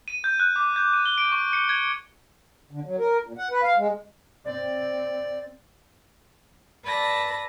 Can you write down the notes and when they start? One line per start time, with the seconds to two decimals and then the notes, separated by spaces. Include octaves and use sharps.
0.08 D#7
0.24 G6
0.40 F#6
0.56 D6
0.76 G6
0.93 D#7
1.06 G7
1.18 D7
1.32 C#6
1.53 C#7
1.69 G#6
2.71 D3
2.85 F#3
2.99 A#4
3.25 A#2
3.38 F#5
3.51 B4
3.63 F5
3.78 G#3
4.45 C4 D5
6.85 B4 D5 A5 E6 A#6